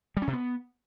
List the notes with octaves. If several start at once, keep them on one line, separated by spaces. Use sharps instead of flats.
G3
C#4
C3
B3